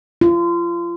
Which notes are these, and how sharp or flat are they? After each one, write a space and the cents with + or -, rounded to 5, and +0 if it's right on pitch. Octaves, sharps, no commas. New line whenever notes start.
F4 -30